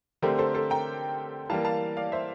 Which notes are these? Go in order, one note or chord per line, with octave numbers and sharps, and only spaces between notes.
D3 A3 C4 G4 A#4
A4 C5
A4 C5
G5 A#5
E3 G3 A#3 F5 A5
F5 A5
D5 F5
C5 E5